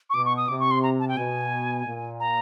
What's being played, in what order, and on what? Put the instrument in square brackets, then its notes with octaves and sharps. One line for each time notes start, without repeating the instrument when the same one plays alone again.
[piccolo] C#6
[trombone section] B2 [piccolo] D6
[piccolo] C#6
D#6
[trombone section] C3 [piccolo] D6
[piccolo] C#6
C6
A#5
A5
G5
[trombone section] B2 [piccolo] G#5
[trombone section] A#2
[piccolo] A#5